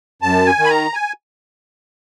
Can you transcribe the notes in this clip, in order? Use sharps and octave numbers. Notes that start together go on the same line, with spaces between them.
F#2 A5
G#5
D#3
B5
A#5
G#5